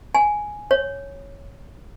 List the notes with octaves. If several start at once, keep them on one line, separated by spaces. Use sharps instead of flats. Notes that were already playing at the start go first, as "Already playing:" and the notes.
G#5
C#5